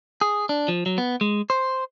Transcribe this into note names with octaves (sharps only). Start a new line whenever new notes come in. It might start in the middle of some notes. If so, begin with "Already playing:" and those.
G#4
D4
F3
F#3
B3
G#3
C5